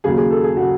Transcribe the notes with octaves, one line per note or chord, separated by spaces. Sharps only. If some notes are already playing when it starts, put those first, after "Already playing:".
D#2 C#3 F#3 G#4
G#4
A4
G#4
C#3 F#3 F#4